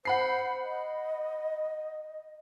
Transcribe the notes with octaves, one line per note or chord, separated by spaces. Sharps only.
C5 F#5 B5 C7
D#5